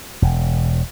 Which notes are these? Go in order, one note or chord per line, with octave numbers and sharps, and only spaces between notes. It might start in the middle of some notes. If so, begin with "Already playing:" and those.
E1